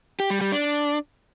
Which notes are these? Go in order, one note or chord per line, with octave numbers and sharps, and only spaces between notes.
G4
G3
G3
D4